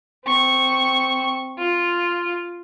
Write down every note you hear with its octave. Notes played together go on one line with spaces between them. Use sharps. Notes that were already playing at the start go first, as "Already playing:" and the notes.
C4 C#6
F4